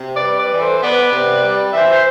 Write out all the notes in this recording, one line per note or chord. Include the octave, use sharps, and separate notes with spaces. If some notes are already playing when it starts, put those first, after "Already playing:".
Already playing: C3
B4 D5
G3
B4 D5
E3
A4 C5
C5
B3 B4 D5
C3
G3
E3 C5 E5
C5